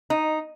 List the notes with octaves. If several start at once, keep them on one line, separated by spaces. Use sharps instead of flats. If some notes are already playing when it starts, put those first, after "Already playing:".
D#4